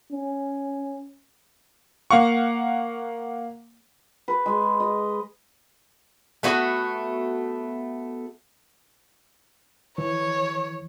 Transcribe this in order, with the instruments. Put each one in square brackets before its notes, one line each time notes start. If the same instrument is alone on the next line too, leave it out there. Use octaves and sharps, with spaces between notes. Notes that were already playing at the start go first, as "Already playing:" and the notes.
[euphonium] C#4
[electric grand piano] A#3 F5 F#5 C#6
[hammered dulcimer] B4
G#3
D#5
[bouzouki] A3 B3 F#4
[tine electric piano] E3 [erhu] C#5